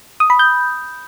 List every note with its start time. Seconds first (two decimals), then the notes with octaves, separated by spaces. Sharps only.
0.20 D#6
0.30 B5
0.39 G6